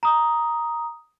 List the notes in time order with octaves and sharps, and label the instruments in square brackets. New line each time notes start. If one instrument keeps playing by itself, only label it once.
[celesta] A#5 D#6